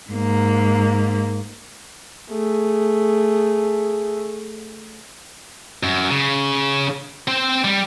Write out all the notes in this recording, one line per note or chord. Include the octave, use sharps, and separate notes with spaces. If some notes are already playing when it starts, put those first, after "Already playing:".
G#2 A#3
A3 G#4
F#2
C#3
C4 C5
G3